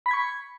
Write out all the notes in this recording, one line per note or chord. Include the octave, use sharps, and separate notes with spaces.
B5 C#6 G#6 B6